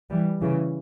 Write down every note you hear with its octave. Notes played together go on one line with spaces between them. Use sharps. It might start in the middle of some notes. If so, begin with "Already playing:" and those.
E3 G3
C#3 E3